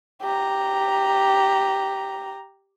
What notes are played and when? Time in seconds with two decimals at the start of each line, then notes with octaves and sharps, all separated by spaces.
0.22 G4 A#5